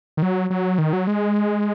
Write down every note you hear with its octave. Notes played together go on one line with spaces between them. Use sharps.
D#3
F#3
F#3
D#3
F#3
G#3